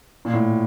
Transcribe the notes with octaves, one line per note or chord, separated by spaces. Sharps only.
A#2
A2